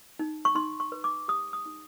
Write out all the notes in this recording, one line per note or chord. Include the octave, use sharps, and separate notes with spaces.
D#4
C#6
D#4 C6
C#6
B4
D6
G4 D#6
D#6
D#4